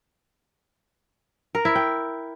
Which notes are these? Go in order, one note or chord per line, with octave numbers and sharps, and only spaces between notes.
A#4
E4
G5